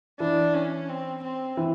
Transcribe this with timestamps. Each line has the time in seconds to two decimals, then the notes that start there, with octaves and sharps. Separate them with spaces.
0.20 E3 D4
0.54 C#4
0.89 C4
1.23 C4
1.57 E3